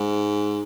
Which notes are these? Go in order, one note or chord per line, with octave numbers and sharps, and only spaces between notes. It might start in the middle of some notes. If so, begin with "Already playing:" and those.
Already playing: G#2